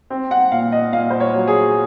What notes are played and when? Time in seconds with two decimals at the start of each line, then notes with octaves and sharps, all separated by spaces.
0.10 C4
0.31 F#5
0.52 A#2 F5
0.72 D#5
0.93 A#2 F5
1.10 C5
1.20 C#5
1.34 F#3
1.47 G#4